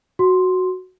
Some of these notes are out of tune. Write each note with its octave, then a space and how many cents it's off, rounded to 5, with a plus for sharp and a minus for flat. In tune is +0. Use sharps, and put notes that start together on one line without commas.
F#4 +0 C6 +0